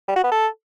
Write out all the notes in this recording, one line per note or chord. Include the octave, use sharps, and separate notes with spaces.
G3
F#4
B3
A4